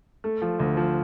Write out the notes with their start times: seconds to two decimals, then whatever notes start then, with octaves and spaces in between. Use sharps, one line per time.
0.24 A3
0.42 F3
0.60 D2
0.77 F3